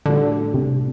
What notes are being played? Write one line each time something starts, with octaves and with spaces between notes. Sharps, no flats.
A2 D3 G3 D4 F#4
C3